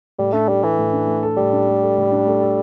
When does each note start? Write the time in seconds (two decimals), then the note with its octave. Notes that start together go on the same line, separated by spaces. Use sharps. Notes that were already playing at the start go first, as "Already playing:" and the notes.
0.19 A2 G3
0.33 A3 D4
0.48 G3 A3
0.63 E3 A4
0.79 A2
0.93 D4
1.07 A3
1.23 A4
1.37 A2 G3
1.53 D4
1.67 A3
1.82 A4
1.97 A2
2.12 D4
2.27 A3
2.42 A4